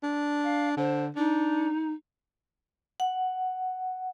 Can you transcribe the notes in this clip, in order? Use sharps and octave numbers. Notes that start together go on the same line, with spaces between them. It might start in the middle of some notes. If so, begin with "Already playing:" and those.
D4
F5
D3 C5
D4 D#4
F#5